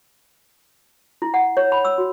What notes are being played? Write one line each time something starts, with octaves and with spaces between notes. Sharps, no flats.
E4
F#5
C#5
B5
E6
F#4